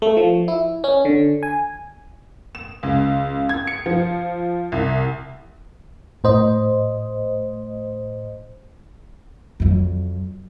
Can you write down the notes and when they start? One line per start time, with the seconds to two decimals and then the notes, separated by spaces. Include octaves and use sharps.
0.02 A3
0.17 F3
0.48 E4
0.84 C#4
1.05 D3
1.43 G#5
2.55 E7
2.83 C#2
3.49 G#6
3.67 C#7
3.86 F3
4.72 C2
6.24 A2 C5 D#5
9.60 F2 F#3